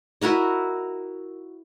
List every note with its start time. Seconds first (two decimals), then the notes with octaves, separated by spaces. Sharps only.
0.21 E4 F#4 A#4 D#5